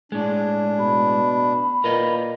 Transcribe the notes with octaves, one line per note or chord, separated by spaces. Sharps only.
A2 G#3 D4
B2 B5
A#2 A#4 B4 D#5